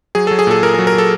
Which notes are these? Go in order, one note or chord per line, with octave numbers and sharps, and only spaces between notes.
F#3 G#4
F#3 A4
G#4
A#2 A4
A#2 A#4
A#4
F#3
A#4
F#3 A4